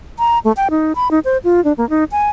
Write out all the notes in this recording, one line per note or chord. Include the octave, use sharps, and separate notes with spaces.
A#5
A3
G5
D#4
B5
D#4
C5
F4
D4
A#3
D#4
G#5